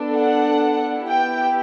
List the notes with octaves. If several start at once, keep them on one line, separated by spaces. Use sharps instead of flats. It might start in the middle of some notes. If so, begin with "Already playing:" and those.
Already playing: B3 D4 A4
F#5
B3 E4 G4 G5